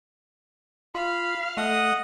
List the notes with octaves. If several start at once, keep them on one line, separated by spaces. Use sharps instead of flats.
F4 F5 B5
A3 D#5 F#5 D#6